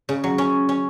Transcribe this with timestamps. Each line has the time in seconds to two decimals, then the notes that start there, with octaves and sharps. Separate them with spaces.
0.09 C#3
0.24 F#3
0.38 C#4
0.69 C#4